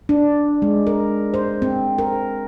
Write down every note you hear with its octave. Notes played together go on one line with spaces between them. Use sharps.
D4
G#3
A#4
C5
C4
A#4